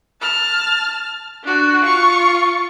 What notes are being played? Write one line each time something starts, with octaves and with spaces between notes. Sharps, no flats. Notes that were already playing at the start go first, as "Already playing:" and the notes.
A5 F6
D4 F#4
F4 C#6